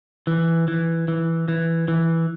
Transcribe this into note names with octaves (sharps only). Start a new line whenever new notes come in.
E3
E3
E3
E3
E3